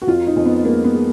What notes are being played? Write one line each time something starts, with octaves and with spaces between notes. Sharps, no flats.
F#4
F2 F4
D#4
F2
B3
G#3 A#3
B3
G#3